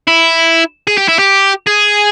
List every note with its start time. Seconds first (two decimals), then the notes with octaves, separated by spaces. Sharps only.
0.08 E4
0.88 G#4
0.98 G4
1.09 E4
1.19 G4
1.67 G#4